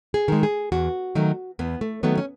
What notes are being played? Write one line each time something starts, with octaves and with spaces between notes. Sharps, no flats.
G#4
D#3 G#3
G#4
E2 F#4
D#3 F#3 A3
E2 B3
A3
D#3 F#3 A3 B3
C#4